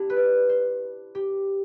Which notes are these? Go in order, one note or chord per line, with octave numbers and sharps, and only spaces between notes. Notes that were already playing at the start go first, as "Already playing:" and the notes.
Already playing: D4 E4 G4
B4
D5
C5
G4